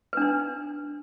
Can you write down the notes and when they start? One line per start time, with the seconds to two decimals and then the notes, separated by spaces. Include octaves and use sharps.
0.13 B4
0.17 D4
0.22 D#4